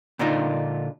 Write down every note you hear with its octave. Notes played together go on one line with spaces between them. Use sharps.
A#2 D3 D4 D#4 F4